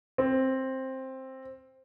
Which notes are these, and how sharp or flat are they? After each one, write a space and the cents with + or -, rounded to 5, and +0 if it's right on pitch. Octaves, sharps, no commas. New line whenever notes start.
C4 +10